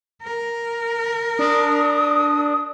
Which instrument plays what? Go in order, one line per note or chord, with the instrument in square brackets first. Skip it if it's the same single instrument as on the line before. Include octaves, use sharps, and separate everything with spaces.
[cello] A#4
[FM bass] D4 [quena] D#6